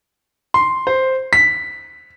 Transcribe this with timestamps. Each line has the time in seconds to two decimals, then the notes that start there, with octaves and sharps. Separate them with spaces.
0.54 C6
0.87 C5
1.33 B6